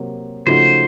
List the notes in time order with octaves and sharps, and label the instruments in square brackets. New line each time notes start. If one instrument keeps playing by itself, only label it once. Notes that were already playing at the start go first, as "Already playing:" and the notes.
Already playing: [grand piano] C3 F#3 A#3
[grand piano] C#3 F3 A3 D#4 F#4 [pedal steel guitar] C5